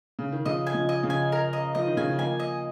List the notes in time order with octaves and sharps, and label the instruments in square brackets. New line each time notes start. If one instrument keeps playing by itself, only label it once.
[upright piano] C#3
D#3
[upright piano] C#3 F3 [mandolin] D#5
[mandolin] G#5
[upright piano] C#3 F3
[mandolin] D#5
[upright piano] C#3 F3
[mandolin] G#5
A#4
D#5
[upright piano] F3 [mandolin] D#5
[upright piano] D#3
[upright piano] C#3 [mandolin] G#5
[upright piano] D#3
[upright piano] F3 A#3 [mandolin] G#5
[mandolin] D#5